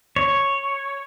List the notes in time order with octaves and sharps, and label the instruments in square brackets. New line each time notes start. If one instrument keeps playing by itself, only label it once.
[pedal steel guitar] C#5